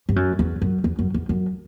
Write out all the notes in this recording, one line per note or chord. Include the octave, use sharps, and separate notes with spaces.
G2
F#2
E2
F#2
E2
F#2
E2
F#2